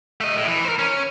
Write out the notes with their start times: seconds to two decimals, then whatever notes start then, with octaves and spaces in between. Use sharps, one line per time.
0.21 A3 D#5
0.37 A2
0.48 E3
0.65 A#4 C5
0.79 C#4